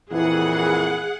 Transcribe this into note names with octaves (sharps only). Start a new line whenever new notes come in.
F2 A#2 E3 G#4 F#5